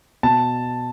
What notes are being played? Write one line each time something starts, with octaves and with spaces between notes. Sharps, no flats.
B2 A5